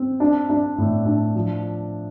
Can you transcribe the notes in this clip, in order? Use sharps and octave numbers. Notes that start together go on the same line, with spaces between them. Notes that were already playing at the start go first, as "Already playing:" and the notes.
Already playing: C4
D4
D4
A2
D4
F3